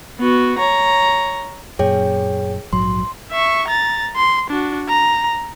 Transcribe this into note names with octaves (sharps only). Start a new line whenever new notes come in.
B3 F#4
C#5 A#5
F#2 A#2 G#4 C#5 G5
A#1 G#2 F#3 C6
E5 C#6
A#5 A6
C6
D4 F#4
A#5